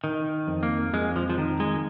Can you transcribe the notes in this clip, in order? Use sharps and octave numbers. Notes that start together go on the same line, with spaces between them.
D#3
F2
A#3
F2 G#3
F3
F3
D#3
G#3